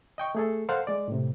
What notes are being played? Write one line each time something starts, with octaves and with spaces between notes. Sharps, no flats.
D#5 G5 C#6
A3 G#4 A4
A4 A#4 C5 F5 F#5
G#3 D5
A2 C3